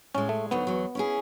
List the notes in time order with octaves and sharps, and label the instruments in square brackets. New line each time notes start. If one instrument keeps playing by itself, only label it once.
[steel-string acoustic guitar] A2 G#3 [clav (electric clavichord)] C#4
[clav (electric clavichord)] A3
[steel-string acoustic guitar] D2 F#3 D#4 [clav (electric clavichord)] B3
[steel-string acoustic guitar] E2 F#3
C#4 E4 G#4